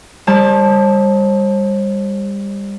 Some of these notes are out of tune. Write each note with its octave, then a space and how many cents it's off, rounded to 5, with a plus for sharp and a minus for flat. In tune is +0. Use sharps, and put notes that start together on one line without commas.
G3 +30 C5 +45 A5 +0